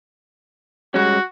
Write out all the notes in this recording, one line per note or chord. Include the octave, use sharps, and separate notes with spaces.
G3 G#3 C#4 F#4